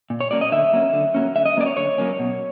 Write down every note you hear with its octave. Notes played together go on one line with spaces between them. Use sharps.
A#2
C#5
F#3 A#3 C#4 D5
D#5
D3 E5
F#3 A#3 C#4
D3
F#3 A#3 C#4
D3 E5
D#5
F#3 A#3 C#4 D5
C#5
D3 C#5
F#3 A#3 C#4
B2